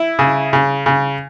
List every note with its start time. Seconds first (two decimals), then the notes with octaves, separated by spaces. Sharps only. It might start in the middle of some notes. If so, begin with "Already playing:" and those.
Already playing: E4
0.19 C#3
0.53 C#3
0.86 C#3